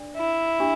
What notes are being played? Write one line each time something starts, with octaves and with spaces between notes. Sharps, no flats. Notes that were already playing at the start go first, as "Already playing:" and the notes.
Already playing: D4 D5
E4
D4 G4